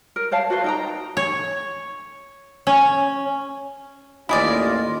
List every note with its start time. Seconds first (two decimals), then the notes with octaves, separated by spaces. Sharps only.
0.16 A#4
0.31 C5 C#5 F5 A5
0.50 F#4 A4 B4 C5
0.64 D#4 G5 A#5
1.17 C#5
2.67 C#4
4.29 A1 D#2 E4 F4 G#4 D5 D#5